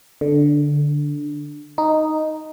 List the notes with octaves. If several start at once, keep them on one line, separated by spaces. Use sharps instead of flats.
D3
D#4